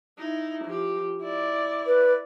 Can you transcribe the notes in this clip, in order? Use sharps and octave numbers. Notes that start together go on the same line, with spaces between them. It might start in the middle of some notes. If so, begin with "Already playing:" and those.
D#4 E4
F3 G4
E4 D5
B4